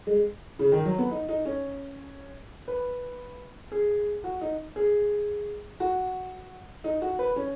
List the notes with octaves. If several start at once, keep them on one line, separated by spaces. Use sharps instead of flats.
G#3
C#3
D#3
F#3
B3
D#4
D#4
C#4
B4
G#4
F#4
D#4
G#4
F#4
D#4
F#4
B4
C#4